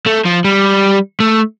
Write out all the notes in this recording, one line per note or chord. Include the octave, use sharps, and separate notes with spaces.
A3
F3
G3
A3